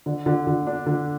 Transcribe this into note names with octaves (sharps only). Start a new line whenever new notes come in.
D3
D3
D3
D4
D3